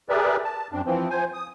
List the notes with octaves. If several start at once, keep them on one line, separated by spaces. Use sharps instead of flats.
G4 G#4 A#4 B4 D5 E5
A5
F#2 C4 D4
E3 F3 C4
F3 C5 G#5
D#6